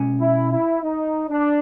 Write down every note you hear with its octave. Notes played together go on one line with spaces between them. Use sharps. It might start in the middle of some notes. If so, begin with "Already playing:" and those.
Already playing: B2 G#3 C#4
E4
E4
D#4
D4